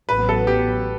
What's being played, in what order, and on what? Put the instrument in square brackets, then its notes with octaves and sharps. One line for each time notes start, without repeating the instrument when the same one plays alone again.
[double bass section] A1 A2 F#3 B3 [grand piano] B4
[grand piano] A4
G4